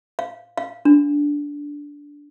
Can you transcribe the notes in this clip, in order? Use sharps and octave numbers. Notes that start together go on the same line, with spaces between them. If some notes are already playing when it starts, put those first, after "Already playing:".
F5
F5
D4